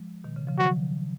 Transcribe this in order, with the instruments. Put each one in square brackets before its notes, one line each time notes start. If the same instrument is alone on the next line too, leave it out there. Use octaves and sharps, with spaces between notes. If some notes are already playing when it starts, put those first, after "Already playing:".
Already playing: [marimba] F3 G#3
B2 D#3
C#3
C#3 F3
[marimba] D#3 F#3 [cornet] F#4